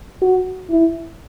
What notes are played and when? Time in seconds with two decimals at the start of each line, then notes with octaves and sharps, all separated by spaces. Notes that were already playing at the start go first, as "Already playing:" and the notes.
0.22 F#4
0.70 E4